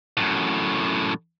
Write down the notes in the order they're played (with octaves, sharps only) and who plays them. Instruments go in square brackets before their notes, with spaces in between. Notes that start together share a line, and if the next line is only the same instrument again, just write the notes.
[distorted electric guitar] F#2 A2